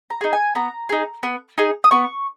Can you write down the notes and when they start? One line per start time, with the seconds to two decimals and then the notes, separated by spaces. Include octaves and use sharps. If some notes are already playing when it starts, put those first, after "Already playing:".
0.10 A#5
0.21 D#4 G#4
0.33 G#5
0.55 B3 A#5
0.89 D#4 G#4
1.23 B3
1.58 D#4 G#4
1.84 D#6
1.91 B3 C#6